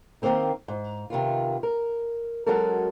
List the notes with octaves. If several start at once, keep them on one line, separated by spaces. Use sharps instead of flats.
D#3 F3 A#3 C4 D#4
G#2
C3 D#3 B3 F4
A#4
F#3 G#3 C#4 F#4 A4 A#4